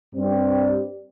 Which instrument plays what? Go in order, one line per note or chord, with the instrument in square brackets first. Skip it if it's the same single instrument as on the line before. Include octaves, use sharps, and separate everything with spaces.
[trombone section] G2 G3 C4 G4